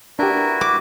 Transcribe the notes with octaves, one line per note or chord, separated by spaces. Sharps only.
D4 E4 F#4 G4 A#4 B4
D6